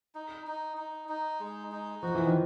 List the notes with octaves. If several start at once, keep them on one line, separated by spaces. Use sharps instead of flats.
D#4
D#4
D#4
D#4
G#3
D#4
F3 F#4
E3
D#3 F3